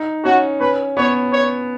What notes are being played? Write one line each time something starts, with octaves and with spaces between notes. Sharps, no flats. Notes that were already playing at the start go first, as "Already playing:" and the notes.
Already playing: D#4
C#4 F#4
C#4 B4
B3 C#5
C#5